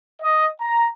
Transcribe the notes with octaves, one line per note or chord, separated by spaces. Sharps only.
D#5
A#5